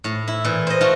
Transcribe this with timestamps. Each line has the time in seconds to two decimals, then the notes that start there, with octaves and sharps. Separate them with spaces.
0.04 A2
0.28 E4
0.45 A#2 E3
0.67 C5 D#5
0.81 A3 F4 F#4